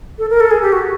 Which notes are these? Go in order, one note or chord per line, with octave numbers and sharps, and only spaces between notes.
A4
A#4
A4
G#4
G4
F#4